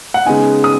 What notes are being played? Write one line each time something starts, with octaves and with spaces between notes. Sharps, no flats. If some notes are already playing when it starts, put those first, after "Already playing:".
F#5
C#3 G#3 B3 D#4 G#5
D#6